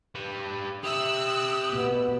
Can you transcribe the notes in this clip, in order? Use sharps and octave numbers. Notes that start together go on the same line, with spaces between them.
G3 B4
G4 E5 D#6 E6 F#6
B2 B3